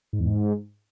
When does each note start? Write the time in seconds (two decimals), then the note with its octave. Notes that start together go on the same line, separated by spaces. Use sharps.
0.13 G#2
0.19 E2
0.26 G#2